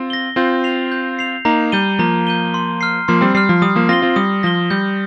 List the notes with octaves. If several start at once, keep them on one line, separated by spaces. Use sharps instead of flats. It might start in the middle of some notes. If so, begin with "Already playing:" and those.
Already playing: C4 F4
A#6 G7
C4 F4 G6
C7 F7
G6
C7 F7
A#3 D#4 A#5
G3 G6 D#7 G7
F3 A#3 A#5
G6 D#7 G7
C6
F6 C7
F3 A#3 C6
G3 C4
G3 F6 C7
F3
G3 D#6
F3 A#3
C4 F4 A#6 G7
C4 F4
G3 D#6
F3 A#6 G7
G3 G6